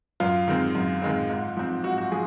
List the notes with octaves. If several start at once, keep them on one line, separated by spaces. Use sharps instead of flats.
F#2 F4
D#3 G#3 C4
F#2
D#3 G#3 C4
G#2
F3 C4
G#2 F#4
F#4
F3 G#4